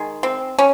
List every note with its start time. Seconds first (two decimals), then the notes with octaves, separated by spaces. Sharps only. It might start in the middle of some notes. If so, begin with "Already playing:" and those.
Already playing: D#3 G#3
0.23 C4
0.58 C#4